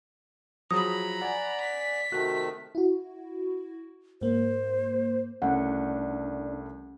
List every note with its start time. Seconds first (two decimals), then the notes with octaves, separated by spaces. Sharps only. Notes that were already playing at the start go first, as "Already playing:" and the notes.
0.71 F3 F#3 G#4 A#5 B5 D#6
1.21 D5 F#5 G#5
1.61 B6
2.12 C3 D#3 A3 F#4 F#6
2.75 E4 F#4
4.21 G#2 A#3 C5
5.42 C2 A3 C#4 D4 F#5